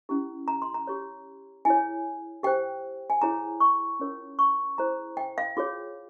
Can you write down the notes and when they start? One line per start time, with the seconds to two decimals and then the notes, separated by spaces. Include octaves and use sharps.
0.09 C#4 E4 G4
0.48 A#5
0.62 C6
0.74 A#5
0.87 G4 C#5
1.65 E4 G#4 C#5 G#5
2.43 G4 C5 G5
3.10 G#5
3.22 E4 G#4 C#5 A#5
3.60 C#6
4.00 C#4 F4 A#4 C#5
4.39 C#6
4.78 E4 G#4 C5 A#5
5.17 G5
5.38 F5
5.57 F4 G#4 C#5